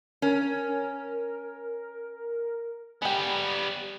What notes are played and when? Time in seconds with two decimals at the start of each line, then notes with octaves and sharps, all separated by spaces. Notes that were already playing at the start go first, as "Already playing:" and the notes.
0.22 C#4 A#4
3.02 G3 G#3 B3 G5